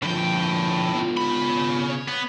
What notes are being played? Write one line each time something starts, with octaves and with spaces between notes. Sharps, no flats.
A2 D3 F3 G5
B3 F4
C#3 B5
C#5
B3